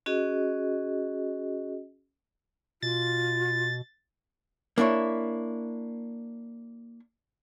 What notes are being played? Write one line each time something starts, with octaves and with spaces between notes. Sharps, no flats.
C#4 F#4 G#4 D#5
B2 F4 A6
A#3 D4 E4 C#5